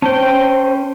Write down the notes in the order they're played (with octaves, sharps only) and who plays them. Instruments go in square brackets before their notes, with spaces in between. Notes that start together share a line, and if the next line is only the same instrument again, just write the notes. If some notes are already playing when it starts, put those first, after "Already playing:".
[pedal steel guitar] C#4 G5 [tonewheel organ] C5 [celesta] A5